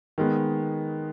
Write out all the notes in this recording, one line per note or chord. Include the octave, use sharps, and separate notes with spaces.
D#3 G#3 B3